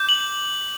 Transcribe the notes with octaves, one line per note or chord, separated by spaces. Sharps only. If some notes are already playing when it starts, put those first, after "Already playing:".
Already playing: D6 G6
F#7